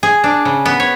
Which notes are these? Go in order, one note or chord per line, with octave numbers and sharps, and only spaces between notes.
G#4
D4
C#3
B3
C#5